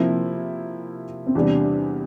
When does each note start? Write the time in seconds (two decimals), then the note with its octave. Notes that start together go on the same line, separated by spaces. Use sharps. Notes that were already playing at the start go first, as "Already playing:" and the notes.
Already playing: C3 F3 A#3 C4 E4
1.26 C4
1.35 E2 C3 G3 D4